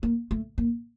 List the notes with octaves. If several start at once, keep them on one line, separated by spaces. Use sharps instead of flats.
A#3
A3
A#3